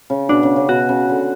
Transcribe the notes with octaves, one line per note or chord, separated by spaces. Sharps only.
C#3
B2 D4
C#3
C#3
B2 F#4
C#3
D3